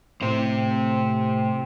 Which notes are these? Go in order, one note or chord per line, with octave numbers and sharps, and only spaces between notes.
A2 C3 C5